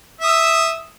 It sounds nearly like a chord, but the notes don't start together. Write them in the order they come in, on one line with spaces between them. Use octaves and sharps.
E5 D#6 E6